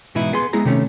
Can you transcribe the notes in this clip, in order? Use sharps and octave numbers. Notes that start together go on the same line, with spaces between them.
G#2 B2 E3 D#4 E4
B3 G#4 C6
G#3 B3 E4 G#4 A#5
C3 D#3 A3 C#4